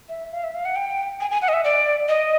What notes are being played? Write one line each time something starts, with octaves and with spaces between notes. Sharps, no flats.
E5
F5
E5
F5
F#5
G5
G#5
G#5
F#5
D#5
E5
D5
D#5